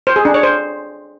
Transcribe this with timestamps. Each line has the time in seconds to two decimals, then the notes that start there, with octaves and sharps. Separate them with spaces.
0.07 C5
0.16 G#4
0.25 D4
0.34 C#5
0.43 C5